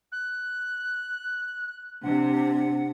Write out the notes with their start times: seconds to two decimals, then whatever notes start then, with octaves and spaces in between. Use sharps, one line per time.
0.11 F#6
2.03 C3 D4 F#5